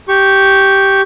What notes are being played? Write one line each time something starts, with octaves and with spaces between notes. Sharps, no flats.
G4 C#6